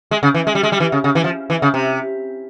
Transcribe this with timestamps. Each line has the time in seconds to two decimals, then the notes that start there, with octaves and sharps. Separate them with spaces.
0.11 G#3
0.23 C#3
0.34 E3
0.47 G#3
0.55 G3
0.63 G#3
0.72 G3
0.80 E3
0.92 C#3
1.04 C#3
1.15 E3
1.24 F3
1.50 E3
1.62 C#3
1.74 C3